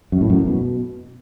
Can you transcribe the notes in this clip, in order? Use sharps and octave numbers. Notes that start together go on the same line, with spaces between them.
F#2
A2
F#2
A2
B2